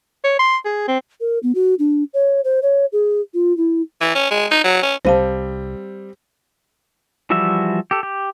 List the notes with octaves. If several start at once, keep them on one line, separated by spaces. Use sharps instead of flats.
C#5
C6
G#4
C4
A#4
B3
F#4
D4
C#5
C5
C#5
G#4
F4
E4
E3
C#4
G#3
D#4
F#3
C#4
C2 G3 C4 C5 F5 A5
E3 F3 G3 F#4 E5
G4 A4
G4